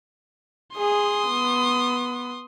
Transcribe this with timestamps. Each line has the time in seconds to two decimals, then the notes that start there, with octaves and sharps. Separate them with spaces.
0.77 G#4 C6 D#6
1.27 B3